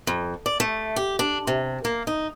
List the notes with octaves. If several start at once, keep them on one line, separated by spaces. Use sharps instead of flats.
F2
D5
A3
G4
D4
C3
A#3
D#4